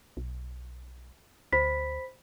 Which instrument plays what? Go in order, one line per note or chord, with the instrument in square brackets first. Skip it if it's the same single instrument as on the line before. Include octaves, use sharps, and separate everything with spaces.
[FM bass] B1
[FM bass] D2 [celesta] C5 B5 B6